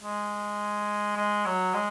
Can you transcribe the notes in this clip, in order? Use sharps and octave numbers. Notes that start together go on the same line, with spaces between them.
G#3
G#3
F#3
G#3